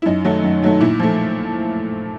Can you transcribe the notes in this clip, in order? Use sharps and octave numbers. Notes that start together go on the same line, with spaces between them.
E4
F#2 D#4
D#3 F#3 A3
F#2
D#3 F#3 A3
A#2 E4
F3 A3